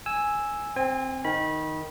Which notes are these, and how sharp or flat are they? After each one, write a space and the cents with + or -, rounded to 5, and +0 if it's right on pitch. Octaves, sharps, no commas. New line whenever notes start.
G#5 +0 E6 +0
C4 +0 G#5 -35
D#3 +0 B5 -25